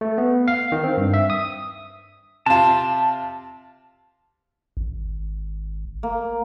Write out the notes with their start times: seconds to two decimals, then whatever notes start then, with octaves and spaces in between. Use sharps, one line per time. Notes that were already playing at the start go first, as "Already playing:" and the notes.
0.01 A3
0.18 B3
0.48 F5
0.72 D#3
0.84 C4
0.97 G2
1.14 E5
1.30 D#6
2.46 C3 F4 A5
4.77 G#1
6.03 A#3